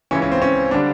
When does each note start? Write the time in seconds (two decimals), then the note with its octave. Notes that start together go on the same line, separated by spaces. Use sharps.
0.11 C#2 C#3 E3 C#4
0.22 C#4
0.32 C4
0.42 C#4
0.71 D4
0.74 D3 G3